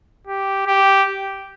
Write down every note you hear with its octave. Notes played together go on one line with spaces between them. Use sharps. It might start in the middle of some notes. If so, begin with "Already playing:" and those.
G4
G4